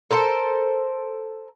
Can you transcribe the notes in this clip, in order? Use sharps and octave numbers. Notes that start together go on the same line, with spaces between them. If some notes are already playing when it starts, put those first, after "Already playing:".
A4 A#4 C5 A5